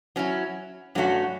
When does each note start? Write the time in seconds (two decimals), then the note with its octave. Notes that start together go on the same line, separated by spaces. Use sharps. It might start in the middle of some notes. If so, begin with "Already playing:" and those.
0.16 F#3 C#4 E4
0.95 G2 F#3 A3 C#4 F#4